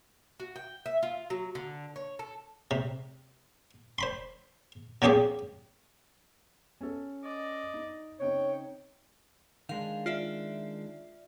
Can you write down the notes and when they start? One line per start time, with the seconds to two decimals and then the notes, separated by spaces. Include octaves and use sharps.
0.40 F#4
0.56 G5
0.86 E5
1.03 F4
1.30 F#3
1.55 D3
1.96 C#5
2.19 A4
2.71 C3
3.98 C5 B5 C6
5.02 B2 F3 C#4 G4 G#4
6.81 C#4 A4
7.24 D5 D#5
7.74 D#4
8.20 C#3 C4 D#4 C#5 G5
9.69 D#3 G#3 D4 F5
10.06 F4 D5 E5